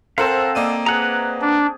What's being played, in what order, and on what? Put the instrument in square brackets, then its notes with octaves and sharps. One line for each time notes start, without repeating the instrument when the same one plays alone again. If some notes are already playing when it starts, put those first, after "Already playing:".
[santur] C4 A4 [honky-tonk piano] A#4 C5 [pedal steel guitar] F5 F#5 A5
[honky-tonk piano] A#3 D5 D#7 [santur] D#5
[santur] G#4 [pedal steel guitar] B4 F#5 A#5
[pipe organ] D4